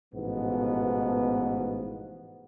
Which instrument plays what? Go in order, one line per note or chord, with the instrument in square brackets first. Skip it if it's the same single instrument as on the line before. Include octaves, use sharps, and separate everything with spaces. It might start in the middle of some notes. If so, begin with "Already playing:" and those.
[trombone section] A1 G#2 B2 F3 B3